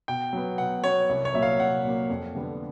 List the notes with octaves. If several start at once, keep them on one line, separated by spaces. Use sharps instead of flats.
B2 G5
F#3 B3
B2 F#5
F#3 B3 C#5
C2
C#5
A#2 F#3 A#3 E5
F5
C2 F#5
A#2 F#3 A#3
F2
D3 G3 B3 D4